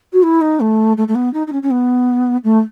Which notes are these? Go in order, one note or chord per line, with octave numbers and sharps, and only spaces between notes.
F#4
E4
D#4
A3
A3
A3
B3
D#4
D#4
C#4
C#4
B3
A3